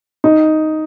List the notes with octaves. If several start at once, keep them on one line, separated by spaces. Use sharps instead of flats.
D#4